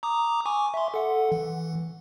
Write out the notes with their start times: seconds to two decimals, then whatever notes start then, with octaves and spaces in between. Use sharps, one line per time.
0.03 A#5 D6 D#6
0.46 G#5 C#6 D6
0.74 E5 C6
0.94 A4 F#5
1.32 E3